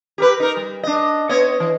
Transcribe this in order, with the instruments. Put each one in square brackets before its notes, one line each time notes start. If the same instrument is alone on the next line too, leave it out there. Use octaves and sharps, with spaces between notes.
[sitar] G4 A#4 B4
D#4 A#4
G3
D4 D#5
B3 C#5 D#5
E3